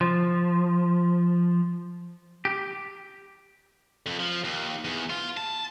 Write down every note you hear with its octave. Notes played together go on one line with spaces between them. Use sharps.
F3
G4
F2
F3
D#2
E2
F4
A5